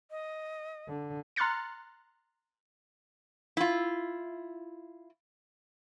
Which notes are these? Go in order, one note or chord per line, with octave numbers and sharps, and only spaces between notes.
D#5
D3
A#5 C6 F6 F#6 A6 C#7
E4 F4